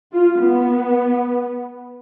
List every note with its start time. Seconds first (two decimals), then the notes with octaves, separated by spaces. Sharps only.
0.14 F4
0.43 B3